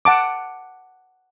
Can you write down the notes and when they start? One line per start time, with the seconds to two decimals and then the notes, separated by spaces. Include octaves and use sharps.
0.05 F#5 A5 D6